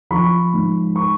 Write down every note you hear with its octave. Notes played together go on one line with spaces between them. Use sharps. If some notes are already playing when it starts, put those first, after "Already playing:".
F3 B5 C#6
G#2
B5 C#6